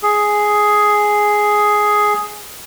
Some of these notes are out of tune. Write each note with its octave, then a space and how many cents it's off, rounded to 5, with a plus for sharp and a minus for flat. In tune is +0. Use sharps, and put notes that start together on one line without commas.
G#4 +5